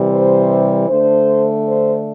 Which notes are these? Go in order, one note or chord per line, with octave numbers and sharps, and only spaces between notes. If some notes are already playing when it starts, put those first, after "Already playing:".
Already playing: C3 E3 G3
C5
D3 A3 D4 C5
C5